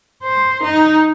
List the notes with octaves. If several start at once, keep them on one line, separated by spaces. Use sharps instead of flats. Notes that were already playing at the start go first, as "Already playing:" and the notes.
C5
D#4